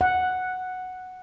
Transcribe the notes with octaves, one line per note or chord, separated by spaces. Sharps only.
F#5